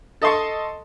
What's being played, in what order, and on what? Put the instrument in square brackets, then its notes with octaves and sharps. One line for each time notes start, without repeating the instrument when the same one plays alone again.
[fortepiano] A4 D#5 A5 C6 C#6